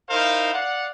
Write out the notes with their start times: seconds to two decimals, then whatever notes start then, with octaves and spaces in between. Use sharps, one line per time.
0.10 D#4 E4 A#4 C5 F5
0.54 D5 F5 F#5